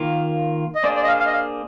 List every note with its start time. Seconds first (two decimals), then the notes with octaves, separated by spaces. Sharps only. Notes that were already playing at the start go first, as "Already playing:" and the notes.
Already playing: D#3 A#3 F4
0.75 D#5
0.83 A#3 D4 G#4 C5 D5
0.96 D5
1.03 D#5
1.08 F5
1.20 F5
1.26 D#5
1.32 F5